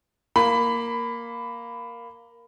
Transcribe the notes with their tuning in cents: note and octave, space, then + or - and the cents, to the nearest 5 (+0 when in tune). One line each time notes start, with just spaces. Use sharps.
A#3 +0 B5 +15